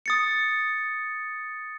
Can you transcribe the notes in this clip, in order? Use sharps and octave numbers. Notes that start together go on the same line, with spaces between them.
D#6 A6 C#7